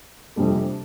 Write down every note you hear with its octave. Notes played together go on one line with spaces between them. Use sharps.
F2 C3 G3 D4 A4